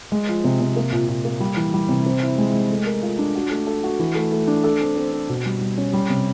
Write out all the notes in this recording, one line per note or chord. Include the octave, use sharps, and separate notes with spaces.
G#3
F3
C3
C3
A#3
A#2
A#2
A#3
G3
E3
G3
C3
C4
E4
G#3
G#3
A3
A#4
F4
D4
F#4
A3
A4
F#4
E3
A3
A3
D4
A4
C4
C4
C4
B2
G3
G3
C#4
G3
C3